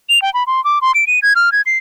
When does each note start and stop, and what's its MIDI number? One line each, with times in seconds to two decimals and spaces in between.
0.09 0.21 101
0.22 0.33 79
0.34 0.44 83
0.47 0.63 84
0.65 0.79 86
0.82 0.92 84
0.95 1.05 98
1.07 1.19 99
1.22 1.33 92
1.36 1.52 89
1.52 1.61 92
1.66 1.78 96